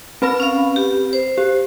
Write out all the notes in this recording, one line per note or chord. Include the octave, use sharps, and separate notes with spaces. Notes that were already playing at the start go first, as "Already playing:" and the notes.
C4 B4 B5
C#4 F5
G4
C5
G4